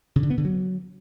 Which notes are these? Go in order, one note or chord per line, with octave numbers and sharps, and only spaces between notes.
C#3
D3
B3
D3
F#3